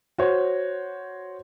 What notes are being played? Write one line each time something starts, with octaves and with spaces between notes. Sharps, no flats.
F#4 C5 C#5